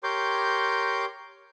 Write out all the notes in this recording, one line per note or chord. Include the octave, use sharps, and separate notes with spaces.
G4 A#4 C#5 C6 D6 G6